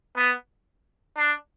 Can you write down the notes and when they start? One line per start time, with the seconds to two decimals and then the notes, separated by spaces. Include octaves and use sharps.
0.17 B3
1.17 D4